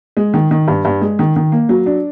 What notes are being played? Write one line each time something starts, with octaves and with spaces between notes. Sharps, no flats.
G#3
D#3
D#3
G2
G2
G#3
D#3
D#3
A#3
F#3
D4